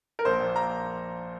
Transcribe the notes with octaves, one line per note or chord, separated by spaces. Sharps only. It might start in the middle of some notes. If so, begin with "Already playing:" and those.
A#4
A#1 C5
A#2
A#5